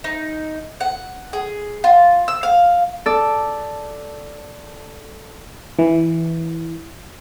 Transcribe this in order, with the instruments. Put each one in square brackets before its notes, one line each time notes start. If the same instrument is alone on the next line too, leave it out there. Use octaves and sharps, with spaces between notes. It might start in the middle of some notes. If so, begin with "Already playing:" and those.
[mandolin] D#4
F#5
G#4
F4
E6
F5
[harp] A4 D5
[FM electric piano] E3